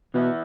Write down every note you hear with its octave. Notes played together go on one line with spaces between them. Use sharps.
B2 E3 B3 E4